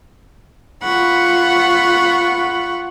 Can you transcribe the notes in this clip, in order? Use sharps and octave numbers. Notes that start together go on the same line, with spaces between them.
F4 F#5 B5 C#6